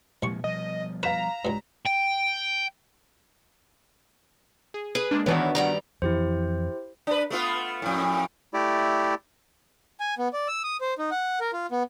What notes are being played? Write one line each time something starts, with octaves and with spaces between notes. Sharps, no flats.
C2 A#2 F3 G#3 C#6
B2 F3 G3 D#5
B4 F5 A#5 B6 E7
C#2 G2
G5
G#4
G#4 B4
G#3 A#3 D4
D#3 E3 B3 D4 E4 F#4 C#5
G2 D#3 G3 F#5 A#5
F2 E3 E4 G4 C5
D4 B4
A3 B3 F4
F2 A2
A3 E4 G4 D5
G#5
B3
D5
E6
D#6
C5
D#4
F#5
A#4
F4
B3